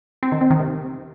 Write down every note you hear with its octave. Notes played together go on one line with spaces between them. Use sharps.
C4
D#3
C4
D#3
C3